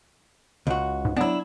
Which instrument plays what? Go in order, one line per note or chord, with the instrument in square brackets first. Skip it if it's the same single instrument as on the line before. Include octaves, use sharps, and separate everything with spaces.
[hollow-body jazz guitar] C#2 F#4
[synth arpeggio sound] G#2
[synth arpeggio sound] F#3 B3 [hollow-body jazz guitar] D4 E4